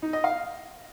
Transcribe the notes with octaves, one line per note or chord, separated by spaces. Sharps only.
D#4
D#5
F5